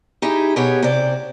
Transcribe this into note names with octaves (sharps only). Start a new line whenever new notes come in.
D#4 E4 G4 G#4
B2 B3 G4 G#4 C#5
C3 C5 D5